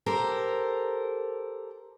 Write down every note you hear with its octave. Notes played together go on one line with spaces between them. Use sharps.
G4 A4 A#4 C5